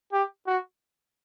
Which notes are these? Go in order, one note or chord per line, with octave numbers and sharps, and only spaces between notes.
G4
F#4